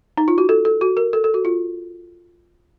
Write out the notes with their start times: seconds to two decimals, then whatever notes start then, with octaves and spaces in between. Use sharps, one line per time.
0.17 D#4
0.28 F4
0.38 F#4
0.49 A4
0.65 A4
0.81 F#4
0.97 A#4
1.13 A4
1.24 A4
1.34 F#4
1.45 F4